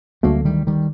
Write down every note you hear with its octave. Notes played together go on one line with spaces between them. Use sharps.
D2 D3 F#3 G3 A3 A#3
D#3 G3
D#3 G3